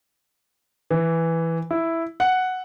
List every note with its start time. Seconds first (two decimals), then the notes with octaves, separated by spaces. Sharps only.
0.91 E3
1.71 E4
2.20 F#5